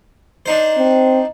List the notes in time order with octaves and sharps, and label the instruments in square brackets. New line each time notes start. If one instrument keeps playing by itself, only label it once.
[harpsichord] D4 D#4 C5
[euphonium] C4